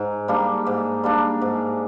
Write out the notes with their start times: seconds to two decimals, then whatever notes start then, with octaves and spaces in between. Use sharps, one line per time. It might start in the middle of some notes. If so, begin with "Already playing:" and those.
Already playing: G#2
0.28 G3 A#3 D4
0.66 G#2
1.04 G3 A#3 D4
1.41 G#2